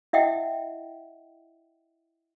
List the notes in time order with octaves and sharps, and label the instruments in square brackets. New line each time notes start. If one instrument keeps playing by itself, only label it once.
[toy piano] E4 D#5 E5 F#5 G5